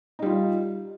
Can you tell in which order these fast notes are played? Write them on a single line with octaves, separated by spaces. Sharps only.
D#4 G3 F4